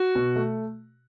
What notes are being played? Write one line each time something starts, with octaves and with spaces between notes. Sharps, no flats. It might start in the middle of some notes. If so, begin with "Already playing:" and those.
Already playing: F#4
B2
A3